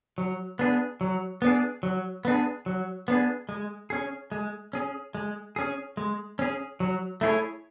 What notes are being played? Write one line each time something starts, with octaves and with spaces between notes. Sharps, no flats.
F#3
B3 D4 G#4
F#3
B3 D4 G#4
F#3
B3 D4 G#4
F#3
B3 D4 G#4
G#3
C#4 G#4
G#3
C#4 G#4
G#3
C#4 G#4
G#3
C#4 G#4
F#3
A3 E4 G#4 C#5